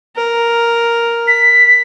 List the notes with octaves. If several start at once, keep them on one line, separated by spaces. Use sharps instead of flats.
A#4
B6